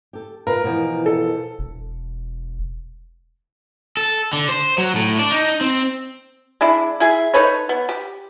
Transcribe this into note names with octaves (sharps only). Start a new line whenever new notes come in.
G4 A4
F4 A#4 B4
B2 E3 F3
A4
E1
A4
D3
C5
F#3
A2
D4
D#4
C4
G#3 D4 E4
E4 G#4 E5
D#4 A4 B4 C#5
B3
G4